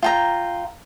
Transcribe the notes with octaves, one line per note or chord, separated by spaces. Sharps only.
F4 G5 A#5